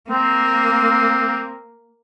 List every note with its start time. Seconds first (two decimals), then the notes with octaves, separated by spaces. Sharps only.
0.10 A#3 C4